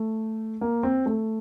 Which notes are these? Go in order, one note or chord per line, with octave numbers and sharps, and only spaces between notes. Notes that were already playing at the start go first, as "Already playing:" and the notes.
Already playing: A3
A#3
C4
A3